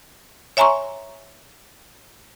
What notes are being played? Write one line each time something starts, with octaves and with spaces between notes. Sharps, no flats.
C#5 E5 G#5 A#5 C6 C#6